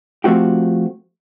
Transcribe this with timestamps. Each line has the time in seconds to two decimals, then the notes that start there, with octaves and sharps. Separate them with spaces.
0.24 F3 A3 C4 F#4 G4